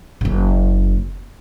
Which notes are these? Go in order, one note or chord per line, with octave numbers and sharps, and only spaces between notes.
F#1 C#3